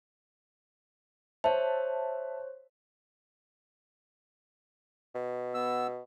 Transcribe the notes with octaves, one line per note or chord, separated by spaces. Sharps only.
C5 C#5 E5 A5
B2
B3 E6